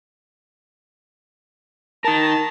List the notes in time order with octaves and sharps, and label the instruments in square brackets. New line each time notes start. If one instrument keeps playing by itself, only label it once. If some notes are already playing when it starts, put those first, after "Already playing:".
[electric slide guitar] D#4 A#4 [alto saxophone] A5